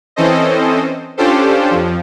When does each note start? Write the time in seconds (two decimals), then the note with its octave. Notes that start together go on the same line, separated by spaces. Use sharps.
0.16 E3 C4 C#4 A4 C5 D#5
1.17 C#4 D4 F4 G4 A4 C5
1.71 F2 F3